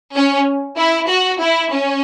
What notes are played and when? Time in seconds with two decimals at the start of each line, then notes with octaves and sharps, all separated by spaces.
0.15 C#4
0.77 E4
1.09 F#4
1.40 E4
1.72 C#4